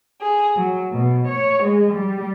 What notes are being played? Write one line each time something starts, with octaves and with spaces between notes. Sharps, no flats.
G#4
F#3
B2
C#5
G#3
G3